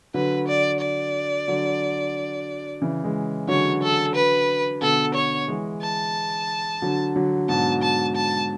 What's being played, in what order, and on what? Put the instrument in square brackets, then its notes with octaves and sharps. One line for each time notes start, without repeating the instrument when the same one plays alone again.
[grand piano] D3 F#3 [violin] B4
[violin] D5
D5
[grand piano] D3 F#3
C#3 E3
E3 G#3
[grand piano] D3 F#3 [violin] C#5
[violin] A4
B4
[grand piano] B2 D3 [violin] A4
[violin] C#5
[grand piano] E3 G#3
[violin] A5
[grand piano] D3 F#3
D3 F#3
[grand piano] G#2 B2 [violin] A5
[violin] A5
A5